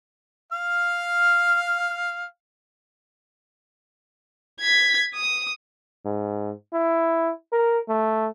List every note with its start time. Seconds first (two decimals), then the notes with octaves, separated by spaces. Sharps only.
0.52 F5 F6
4.60 G#6 B6
5.15 D#6
6.05 G#2
6.73 E4
7.53 A#4
7.89 A3